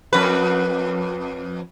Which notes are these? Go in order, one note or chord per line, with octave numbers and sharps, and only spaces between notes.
F2 B4